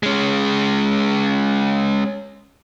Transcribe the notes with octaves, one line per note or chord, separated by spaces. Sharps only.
G#3 C#4